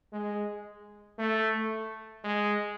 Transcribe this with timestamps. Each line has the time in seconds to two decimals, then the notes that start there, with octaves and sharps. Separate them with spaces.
0.12 G#3
1.18 A3
2.24 G#3